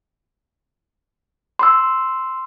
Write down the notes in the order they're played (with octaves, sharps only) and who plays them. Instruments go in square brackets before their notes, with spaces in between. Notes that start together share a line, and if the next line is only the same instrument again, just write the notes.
[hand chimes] C6 E6